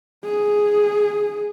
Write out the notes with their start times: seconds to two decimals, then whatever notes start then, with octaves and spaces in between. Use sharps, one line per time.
0.24 G#4